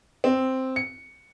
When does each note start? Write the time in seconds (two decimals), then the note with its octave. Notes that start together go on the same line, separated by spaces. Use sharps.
0.24 C4
0.76 C#7